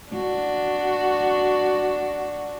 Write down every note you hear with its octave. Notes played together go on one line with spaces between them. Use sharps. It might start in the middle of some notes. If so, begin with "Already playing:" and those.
D4 F#4